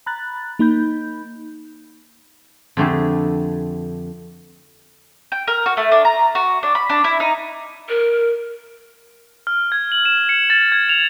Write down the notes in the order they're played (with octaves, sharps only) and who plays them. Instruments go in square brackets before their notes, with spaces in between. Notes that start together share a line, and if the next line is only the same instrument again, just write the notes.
[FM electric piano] A#5 B5 F#6 A6
A#3 D#4 B5 G6
[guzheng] F2 D3 A3 G4 G#4
[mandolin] G5
A#4
F#4
A3
D4
A#5
F#4
D4
B5
D4
E4
D#4
[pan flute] A#4
[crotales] F6
G#6
F#7
E7
C#7
A6
G#6
F7